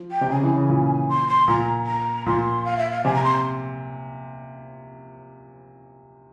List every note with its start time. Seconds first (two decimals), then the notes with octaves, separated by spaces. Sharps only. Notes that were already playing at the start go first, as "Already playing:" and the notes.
Already playing: F3
0.12 G5
0.21 C3
0.30 C#3 G#5
0.43 E3
0.56 C#3
0.69 A#2
1.09 C6
1.28 C6
1.48 A#2 A#5
1.86 A#5
2.26 A#2 C6
2.65 F5
2.78 E5
2.91 F5
3.05 C3 G#5
3.14 A#5
3.24 C6